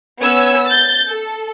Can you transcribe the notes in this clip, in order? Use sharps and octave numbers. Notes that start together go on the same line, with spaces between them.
B3 C#4 E6 G#6
G6 A6
A4